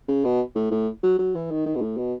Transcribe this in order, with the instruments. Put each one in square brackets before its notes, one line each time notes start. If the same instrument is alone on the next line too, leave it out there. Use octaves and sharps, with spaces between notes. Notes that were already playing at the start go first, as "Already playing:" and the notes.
[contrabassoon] C#3
B2
A2
A2
F#3
F#3
E3
D#3
D#3
B2
A2
B2